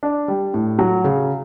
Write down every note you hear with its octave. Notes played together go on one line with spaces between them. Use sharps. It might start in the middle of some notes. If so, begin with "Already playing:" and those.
D4
G3
A2
F#3
C#3